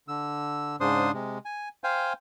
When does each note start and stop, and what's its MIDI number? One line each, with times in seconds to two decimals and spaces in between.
0.08 0.76 50
0.08 0.76 88
0.80 1.11 44
0.80 1.11 49
0.80 1.11 62
0.80 1.11 72
0.80 1.11 84
0.80 1.11 87
1.14 1.38 48
1.14 1.38 56
1.45 1.69 80
1.84 2.13 72
1.84 2.13 77
1.84 2.13 79
1.84 2.13 80